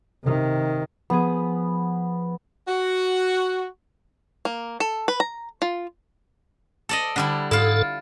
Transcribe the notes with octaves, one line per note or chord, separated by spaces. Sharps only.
C3 D#3
F3 B3 G#4
F#4
A#3
A4
B4
A#5
F4
A4 D5 D#5
D3 G3 E4
G#2 E4 F4 A4